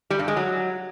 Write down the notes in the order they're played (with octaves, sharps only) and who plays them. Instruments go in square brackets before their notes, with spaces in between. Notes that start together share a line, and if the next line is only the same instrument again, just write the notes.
[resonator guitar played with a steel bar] G3
G2
G#3
F#3